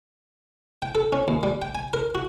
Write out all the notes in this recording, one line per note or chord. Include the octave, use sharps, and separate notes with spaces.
G5
A4
C#4
D#2
G3
G5
G#5
A#4
F#4